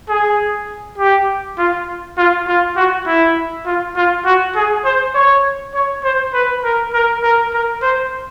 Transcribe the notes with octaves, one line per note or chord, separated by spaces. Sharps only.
G#4
G4
F4
F4
F4
F#4
E4
F4
F4
F#4
G#4
C5
C#5
C#5
C5
B4
A#4
A#4
A#4
A#4
C5